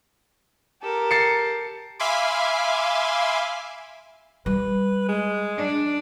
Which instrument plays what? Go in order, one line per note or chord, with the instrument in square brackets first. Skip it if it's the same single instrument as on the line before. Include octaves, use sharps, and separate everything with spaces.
[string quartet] G4 A4 A#4
[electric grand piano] A6 C7 C#7
[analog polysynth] E5 F5 G#5 B5 C6 D6
[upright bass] G3 [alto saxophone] B4
[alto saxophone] G#3
[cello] D4